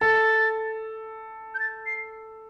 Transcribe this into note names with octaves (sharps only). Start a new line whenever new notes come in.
A4 A6
G6
A6
C7